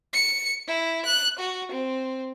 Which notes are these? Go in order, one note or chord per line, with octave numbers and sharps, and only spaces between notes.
C#7
E4
F#6
F#4
C4